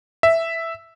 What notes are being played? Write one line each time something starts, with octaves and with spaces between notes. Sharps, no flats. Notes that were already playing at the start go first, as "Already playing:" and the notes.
E5